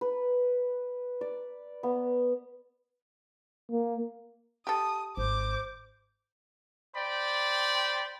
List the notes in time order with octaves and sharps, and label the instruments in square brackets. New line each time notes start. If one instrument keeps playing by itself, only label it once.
[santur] B4
D5
B3
[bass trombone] A#3
[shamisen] G4 A4 [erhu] D#6
[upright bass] G#1 [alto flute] C5 [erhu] D6
[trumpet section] C5 D5 G5 B5